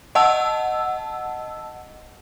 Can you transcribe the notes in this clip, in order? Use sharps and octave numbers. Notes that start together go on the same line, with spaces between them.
D#5 F#5 A5 E6